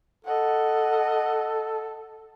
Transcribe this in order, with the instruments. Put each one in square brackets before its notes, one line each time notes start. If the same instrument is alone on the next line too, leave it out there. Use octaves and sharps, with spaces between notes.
[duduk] A4 [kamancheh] D#5 F#5